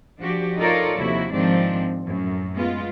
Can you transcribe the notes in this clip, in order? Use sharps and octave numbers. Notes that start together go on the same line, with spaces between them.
F3 D4 F#4 G4
D#4 F4 A4 A#4 C#5 D5
D#2 C3 F3 E4 F#4
G#2 D#3 F3 C4 D4
F#2 A2
G#3 B3 F4